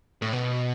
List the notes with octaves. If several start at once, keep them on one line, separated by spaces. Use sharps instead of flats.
A2
B2